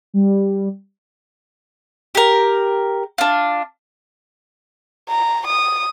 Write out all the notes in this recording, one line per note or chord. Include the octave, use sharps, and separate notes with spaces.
G3
G4 A#4
D4 F4
A#5
D#6